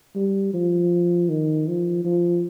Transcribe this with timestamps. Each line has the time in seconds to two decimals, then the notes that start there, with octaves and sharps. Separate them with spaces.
0.15 G3
0.54 F3
1.29 D#3
1.68 F3
2.05 F3